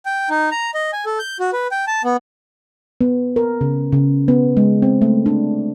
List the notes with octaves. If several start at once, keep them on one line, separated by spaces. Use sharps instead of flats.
G5
D#4
A#5
D#5
G#5
A4
G6
F#4
B4
G5
A5
B3
B3
A#4
C#3
C#3
B3
G#3
C4
A3
D4